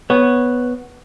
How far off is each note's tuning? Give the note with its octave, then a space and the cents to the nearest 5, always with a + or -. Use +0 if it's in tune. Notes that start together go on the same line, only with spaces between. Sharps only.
B3 +0 C#5 -5